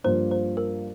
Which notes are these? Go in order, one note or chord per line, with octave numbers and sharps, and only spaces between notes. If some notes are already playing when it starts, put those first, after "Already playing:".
G2 F3 A#3 F4 C5
C5
A#4